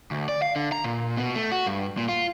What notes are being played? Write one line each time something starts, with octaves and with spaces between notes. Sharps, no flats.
D2
D5
F5
D3
A#5
A#2
B2
A3
F#4
G2
A#2
F4